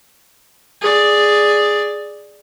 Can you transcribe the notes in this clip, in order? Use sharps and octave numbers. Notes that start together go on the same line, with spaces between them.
G#4 D5